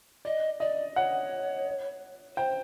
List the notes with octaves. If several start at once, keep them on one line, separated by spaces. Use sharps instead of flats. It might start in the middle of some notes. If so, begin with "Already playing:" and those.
D5 D#5
D5 D#5
C#5 F#5
C5 G5